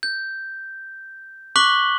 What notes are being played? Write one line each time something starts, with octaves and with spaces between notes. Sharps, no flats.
G6
C#6 D6 F#6 B6 F#7 G7